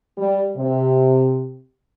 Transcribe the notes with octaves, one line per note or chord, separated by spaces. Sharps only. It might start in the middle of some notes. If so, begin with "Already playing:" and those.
G3
C3